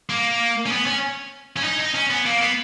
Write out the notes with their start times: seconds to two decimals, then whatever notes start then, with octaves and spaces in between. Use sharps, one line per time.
0.09 A#3
0.66 C#4
0.71 B3
0.86 C#4
1.57 C#4
1.64 D#4
1.80 D#4
1.95 C#4
2.10 B3
2.26 A#3
2.41 B3